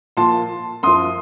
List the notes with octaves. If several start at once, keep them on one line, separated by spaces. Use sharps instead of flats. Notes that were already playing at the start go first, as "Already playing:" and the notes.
A#2 F3 A5 C6
F#2 F3 C6 D#6